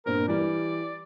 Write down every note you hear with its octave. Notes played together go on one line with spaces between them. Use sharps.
G2 A#2 C4 A#4
E3 G3 D5